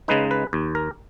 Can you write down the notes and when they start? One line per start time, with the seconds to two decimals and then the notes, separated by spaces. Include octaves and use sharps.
0.08 C#3 G#3 D#4 B4
0.31 B4
0.53 D#2
0.75 A#4